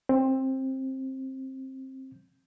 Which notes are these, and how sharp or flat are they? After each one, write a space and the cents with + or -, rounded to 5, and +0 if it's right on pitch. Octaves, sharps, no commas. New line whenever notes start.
C4 +20